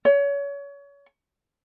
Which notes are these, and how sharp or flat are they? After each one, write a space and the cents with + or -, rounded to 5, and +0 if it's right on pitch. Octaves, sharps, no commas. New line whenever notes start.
C#5 +30